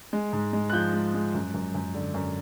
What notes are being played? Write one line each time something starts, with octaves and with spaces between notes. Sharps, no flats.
G#3
G#2
G#3
F#6
F3 G6
G#3
G#3
F#2
F#2
F#2
D3
F#2